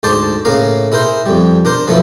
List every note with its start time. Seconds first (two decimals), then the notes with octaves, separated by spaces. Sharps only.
0.03 D2 G#2 C5 D5 A5
0.45 A2 C#3 A#3 F5 A#5
0.92 E4 G#4 A#4 C5
1.26 F2 G3
1.65 D4 A#4 C5
1.87 F3 F#3 A3 B3 E4